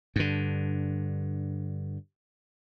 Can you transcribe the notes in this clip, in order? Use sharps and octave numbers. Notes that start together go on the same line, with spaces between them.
G2 D3